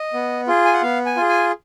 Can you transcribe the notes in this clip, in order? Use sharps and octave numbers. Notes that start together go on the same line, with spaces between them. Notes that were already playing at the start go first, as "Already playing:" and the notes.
Already playing: D#5
B3
F4 G#4
G#5
F#5
B3 F5
G#5
F4 G#4
G#5